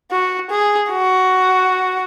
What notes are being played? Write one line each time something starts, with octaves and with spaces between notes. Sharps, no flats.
F#4
G#4
F#4